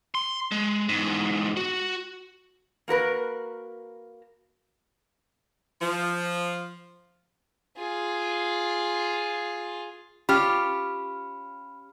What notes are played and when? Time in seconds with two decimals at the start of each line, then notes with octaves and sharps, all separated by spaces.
0.15 C6
0.52 G#3
0.89 E2 G#2
1.57 F#4
2.88 A#3 F#4 A#4 B4
5.82 F3
7.78 F4 G#4
10.29 C#4 F4 G4 B5 F6